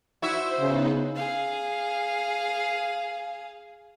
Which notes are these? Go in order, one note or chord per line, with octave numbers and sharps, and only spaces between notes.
E4 F#4 C5 E5
C#3 B3 D#4 B4
G#4 F5